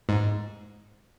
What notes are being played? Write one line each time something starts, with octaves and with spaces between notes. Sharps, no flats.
G#2